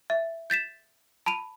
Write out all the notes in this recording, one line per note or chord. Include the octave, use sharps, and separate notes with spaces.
E5
G6 A6 B6 E7
A5 B5 D#7 F7